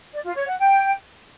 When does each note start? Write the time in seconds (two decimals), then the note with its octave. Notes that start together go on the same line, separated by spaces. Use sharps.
0.13 D5
0.25 F4
0.36 C#5
0.47 F#5
0.59 G5